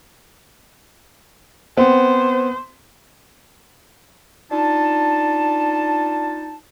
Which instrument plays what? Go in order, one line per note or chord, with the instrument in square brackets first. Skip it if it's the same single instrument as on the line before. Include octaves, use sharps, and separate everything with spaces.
[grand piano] B3 [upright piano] C4 [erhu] C5
[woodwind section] D4 D#4 F4 A5